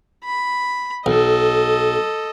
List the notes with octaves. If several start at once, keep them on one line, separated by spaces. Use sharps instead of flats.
B5
B1 A4 D#5